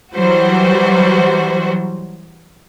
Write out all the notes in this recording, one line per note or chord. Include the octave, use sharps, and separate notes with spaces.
E3 F#3 G3 F#4 C5